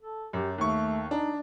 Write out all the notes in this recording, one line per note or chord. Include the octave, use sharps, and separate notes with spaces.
A4
F#2 G4
D#2 A3 C#6
D4 D#4